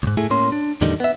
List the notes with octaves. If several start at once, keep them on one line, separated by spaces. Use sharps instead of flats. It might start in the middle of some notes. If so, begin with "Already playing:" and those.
C#2 G#2
A2 A3 E4 G#4
A2 A#3 C#4 C6
D4
E2 A2 D3 D#3 G3 D#4
B3 E5